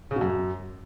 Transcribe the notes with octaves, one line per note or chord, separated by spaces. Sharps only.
C#3
B2
F#2